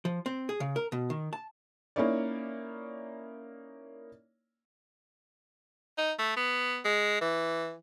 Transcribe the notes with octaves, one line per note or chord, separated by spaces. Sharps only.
F3
C4
G#4
C#3
A#4
B2
D#3
A5
A#3 C#4 D#4 E4 C#5 D5
D#4
A3
B3
G#3
E3